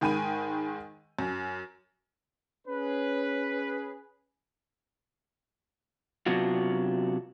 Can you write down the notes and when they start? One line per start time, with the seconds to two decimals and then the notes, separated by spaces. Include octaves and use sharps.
0.01 G#2 D#3 G5 G#5 B5 D#7
1.19 F#2
2.67 C#4 G#4 B4
6.26 C3 F#3 B3 D4 F4 F#4